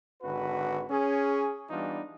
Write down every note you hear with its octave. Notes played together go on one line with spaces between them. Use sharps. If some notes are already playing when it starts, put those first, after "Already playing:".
G#1 D3 F#4 B4
C#4 G#4
E3 G3 B3 D4 D#4 F4